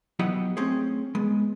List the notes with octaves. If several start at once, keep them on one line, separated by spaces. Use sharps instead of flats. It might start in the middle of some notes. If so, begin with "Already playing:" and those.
F#3 B3 E4 G4 D#5 F#5
A3 C4 C#4 G#4
G#3 B3